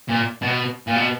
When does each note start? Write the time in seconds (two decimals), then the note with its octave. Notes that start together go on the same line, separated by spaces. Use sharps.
0.09 A#2
0.42 B2
0.87 A#2
0.96 B2